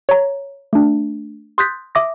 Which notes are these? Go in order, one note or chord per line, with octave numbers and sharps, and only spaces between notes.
C#5 A#5
A3 D4
C6 D#6 F#6 G6 A6 B6
E5 D6 D#6 A#6